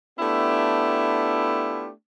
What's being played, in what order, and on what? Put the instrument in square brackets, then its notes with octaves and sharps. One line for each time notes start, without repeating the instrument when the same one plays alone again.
[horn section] A3 B3 D4 E4 F4 G4